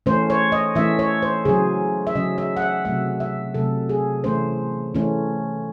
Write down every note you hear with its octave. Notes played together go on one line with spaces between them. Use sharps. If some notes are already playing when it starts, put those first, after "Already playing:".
E3 A3 C#4 C5
C#5
D#5
E3 A3 C#4 E5
C#5
C5
C#3 F#3 C#4 G#4
E5
C#3 F#3 C#4 D#5
E5
F#5
E5
C3 F#3 A3 E5
E5
C3 F#3 A3 A4
G#4
E3 A3 C#4 C5
E3 A3 C#4